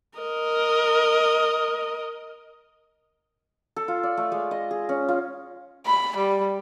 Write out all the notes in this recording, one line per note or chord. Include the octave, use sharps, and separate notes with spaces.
A#4 D#5
A4
F4
D5
A3
G#3
D#5
G#4
C#4
F4
B5
G3